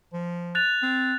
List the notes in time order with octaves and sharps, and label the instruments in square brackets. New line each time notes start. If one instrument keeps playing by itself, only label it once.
[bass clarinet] F3
[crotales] F#6 A6 F7
[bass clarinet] C4